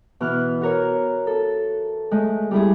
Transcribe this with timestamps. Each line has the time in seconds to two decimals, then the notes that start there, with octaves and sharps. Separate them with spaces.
0.20 B2 E3 F6 F#6
0.61 F#4 A#4 C#5
1.27 A4
2.11 G#3 A3
2.51 G3 A3 E4 G#4